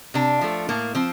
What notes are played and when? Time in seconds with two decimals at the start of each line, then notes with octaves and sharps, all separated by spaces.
0.14 C3 D4
0.41 F3 A3
0.69 A2 A#3
0.95 F3 C4